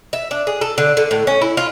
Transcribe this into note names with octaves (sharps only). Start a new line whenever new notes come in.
E5
D4
G#4
A4
D3
D3
A2
C#4
E4
F4